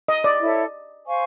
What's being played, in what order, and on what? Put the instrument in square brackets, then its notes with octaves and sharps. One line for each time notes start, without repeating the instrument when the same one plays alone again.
[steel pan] D#5
D5
[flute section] E4 A4 C#5 E5
C5 F5 G#5 C#6